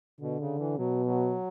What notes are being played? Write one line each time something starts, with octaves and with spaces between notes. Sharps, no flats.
B2 D3
C#3
E3
B2 F#3
F#3